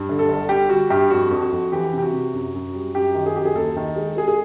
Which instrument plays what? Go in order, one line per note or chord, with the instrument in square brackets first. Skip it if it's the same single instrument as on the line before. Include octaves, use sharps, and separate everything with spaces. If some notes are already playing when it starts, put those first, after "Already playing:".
Already playing: [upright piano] G2
D3
A4
G1
G3 G4
G3 F#4
G2 G4
F2 F#4
F2
F#4
F2
E3 G4
C3
G4
F#4
C3
F#2
F#2
G3
F#2 G4
D#3
G#4
F#2 G4
G#4
D#2 A4
D#3
G#3
G#3 G#4
G#4